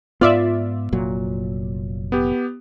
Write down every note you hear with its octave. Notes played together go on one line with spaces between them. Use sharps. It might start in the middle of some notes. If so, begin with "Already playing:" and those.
G#2 B3 F4 D5 E5
F1 A#2 F#3
B3 G4